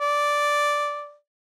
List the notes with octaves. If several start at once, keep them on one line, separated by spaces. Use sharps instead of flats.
D5